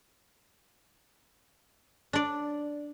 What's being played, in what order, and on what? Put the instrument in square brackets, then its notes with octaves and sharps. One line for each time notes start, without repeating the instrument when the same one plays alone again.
[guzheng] D4 D5